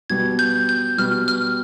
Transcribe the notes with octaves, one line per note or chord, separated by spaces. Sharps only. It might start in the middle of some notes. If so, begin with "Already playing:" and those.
B2 G3 B3 G#6
G6
G6
B2 G3 B3 F6
F6